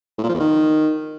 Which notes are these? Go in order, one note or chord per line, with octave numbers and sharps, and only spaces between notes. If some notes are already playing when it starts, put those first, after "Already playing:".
A2
A#2
F3
E2
D#3